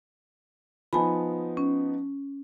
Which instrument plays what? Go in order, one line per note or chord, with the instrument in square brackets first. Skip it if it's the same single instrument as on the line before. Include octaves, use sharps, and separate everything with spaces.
[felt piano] F3 B3 D#4 [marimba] G#5 A5 B5
[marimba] C#4